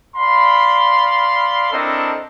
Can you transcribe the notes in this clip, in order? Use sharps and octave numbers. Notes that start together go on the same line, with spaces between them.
D5 F5 B5 C6
C4 D4 E4 A4 A#4 D#5